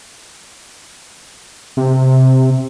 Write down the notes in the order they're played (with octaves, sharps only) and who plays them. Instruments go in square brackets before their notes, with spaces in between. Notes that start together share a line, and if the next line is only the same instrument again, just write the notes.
[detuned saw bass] C3